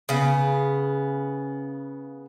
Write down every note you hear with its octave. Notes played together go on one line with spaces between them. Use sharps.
C#3 B3